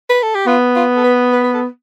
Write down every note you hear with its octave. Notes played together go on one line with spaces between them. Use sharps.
B4
A4
G4
B3 F4
F4
A4
B4
B4
B4
A4